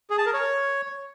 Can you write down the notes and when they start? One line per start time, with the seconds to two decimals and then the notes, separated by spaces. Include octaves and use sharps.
0.10 G#4
0.18 A5
0.26 A#4
0.34 C#5